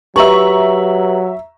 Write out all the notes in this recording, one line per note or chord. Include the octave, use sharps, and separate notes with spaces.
F#3 G4 B4 E5 A#5 C#6 F#7